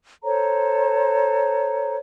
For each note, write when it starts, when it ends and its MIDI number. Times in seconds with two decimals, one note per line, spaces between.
0.23 1.96 69
0.23 1.96 72
0.23 1.96 73
0.23 1.96 82